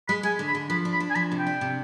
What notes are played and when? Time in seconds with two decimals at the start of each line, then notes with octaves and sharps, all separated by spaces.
0.08 G#3 B5
0.23 G#3 G#5
0.39 D3
0.47 B5
0.55 D3
0.69 F3 B5
0.85 D4
0.93 B5
1.00 D4
1.10 G#5
1.15 F3 B5
1.32 C3
1.39 G5
1.47 D4
1.61 C3